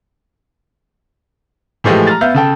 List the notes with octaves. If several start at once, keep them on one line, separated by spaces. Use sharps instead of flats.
A2 E3 F3 G#3 A3 G4
A#5 F6 A6
B3 E5 F5 F6 G6
C#3 A4 G5